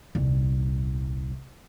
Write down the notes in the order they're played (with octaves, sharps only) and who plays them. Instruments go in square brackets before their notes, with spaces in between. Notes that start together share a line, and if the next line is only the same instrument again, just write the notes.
[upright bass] D#1 C2